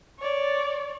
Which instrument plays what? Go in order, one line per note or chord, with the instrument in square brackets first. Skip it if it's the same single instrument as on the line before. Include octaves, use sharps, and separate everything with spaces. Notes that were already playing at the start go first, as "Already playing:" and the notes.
[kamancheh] C#5 D5